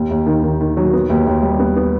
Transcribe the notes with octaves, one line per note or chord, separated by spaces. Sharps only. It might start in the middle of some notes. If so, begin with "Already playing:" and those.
Already playing: D#2
D#2
D#3
D#3
D#3
F#3
B3
D#2
D#2
G3
B3
B3